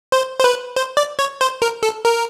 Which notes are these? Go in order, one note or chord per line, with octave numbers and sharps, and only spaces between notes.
C5
C5
B4
C5
D5
C#5
C5
A#4
A4
A#4